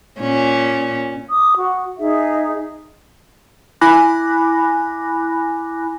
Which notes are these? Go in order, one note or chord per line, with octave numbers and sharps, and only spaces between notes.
A#2 C#4
D6 D#6
F#4
D#4 G#4 E5
E4 G#5 B5 D6 F#6 A#6